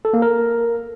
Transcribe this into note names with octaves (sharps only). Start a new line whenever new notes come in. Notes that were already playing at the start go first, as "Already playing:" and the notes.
A4
A#3
A#4